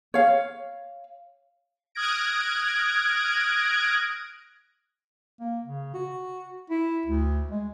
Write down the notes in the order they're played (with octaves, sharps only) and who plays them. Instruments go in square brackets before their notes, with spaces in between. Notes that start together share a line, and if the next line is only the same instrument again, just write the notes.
[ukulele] C#5 F5
[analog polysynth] D#6 F6 F#6 G#6 A#6 D7
[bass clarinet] A#3
C#3
F#4
E4
D2
G#3